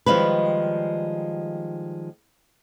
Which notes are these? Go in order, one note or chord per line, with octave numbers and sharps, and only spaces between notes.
D#3 F3 G3 G#3 B4